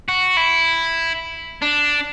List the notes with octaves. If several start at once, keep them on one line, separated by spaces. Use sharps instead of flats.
F#4
E4
D4